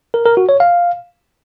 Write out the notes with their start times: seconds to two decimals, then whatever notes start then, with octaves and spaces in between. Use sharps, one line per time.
0.14 A#4
0.26 A#4
0.37 F#4
0.49 C#5
0.60 F5